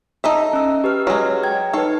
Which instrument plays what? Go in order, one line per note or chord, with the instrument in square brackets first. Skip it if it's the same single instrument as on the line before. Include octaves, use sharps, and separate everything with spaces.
[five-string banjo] D#4 A4 E5
[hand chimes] C#4 E6
G4 B4 F6
[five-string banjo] F#3 G#3
[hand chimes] G5 A#5 G#6
[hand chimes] D#4 B4 [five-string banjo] A4 C#5